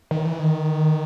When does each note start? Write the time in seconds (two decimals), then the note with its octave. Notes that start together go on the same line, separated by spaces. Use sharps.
0.11 D#3
0.25 E3
0.39 D#3